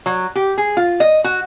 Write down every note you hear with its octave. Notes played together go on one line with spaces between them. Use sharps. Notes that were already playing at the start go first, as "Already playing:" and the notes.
F#3
G4
G#4
F4
D#5
F#4